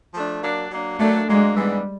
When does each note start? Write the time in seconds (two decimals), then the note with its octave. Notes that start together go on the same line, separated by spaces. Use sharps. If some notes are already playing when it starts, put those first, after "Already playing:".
0.14 F3 A3 D4
0.43 F#3 A#3 D4
0.71 F#3 A#3 D4
0.99 F#3 A3 A#3 D4
1.28 F#3 G#3 A#3 D4
1.56 G#2 E3 G3 G#3 B3 D4